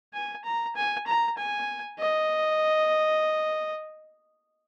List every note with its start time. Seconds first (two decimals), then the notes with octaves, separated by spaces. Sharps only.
0.13 G#5
0.44 A#5
0.76 G#5
1.07 A#5
1.38 G#5
1.99 D#5